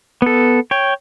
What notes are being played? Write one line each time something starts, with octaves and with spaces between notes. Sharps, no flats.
B3 A4
C#5 G5